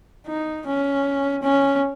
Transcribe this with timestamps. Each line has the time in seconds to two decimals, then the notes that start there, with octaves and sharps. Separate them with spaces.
0.27 D#4
0.67 C#4
1.43 C#4